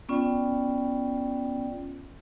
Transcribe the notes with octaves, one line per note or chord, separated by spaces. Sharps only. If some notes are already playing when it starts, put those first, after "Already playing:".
B3 C#4 F4 D5 G5